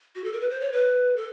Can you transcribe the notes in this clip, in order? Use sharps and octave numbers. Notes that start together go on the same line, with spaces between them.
F#4
A4
A#4
B4
C5
C#5
B4
A4